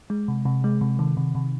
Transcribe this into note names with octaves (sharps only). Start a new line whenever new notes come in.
G#3
C3
C3
G#3
C3
D#3
C3
C3